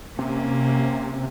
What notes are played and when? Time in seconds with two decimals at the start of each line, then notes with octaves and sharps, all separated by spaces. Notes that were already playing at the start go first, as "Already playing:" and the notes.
0.19 C3 A#3 C#4